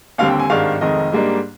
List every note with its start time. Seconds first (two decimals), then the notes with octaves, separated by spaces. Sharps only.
0.18 D#2 D3 G3 C4 F5
0.29 G5
0.40 G#5
0.50 G#1 G2 D#3 G#3 D4 F5
0.81 F1 F2 D#3 G#3 D#5
1.12 G#2 G3 A#3 D4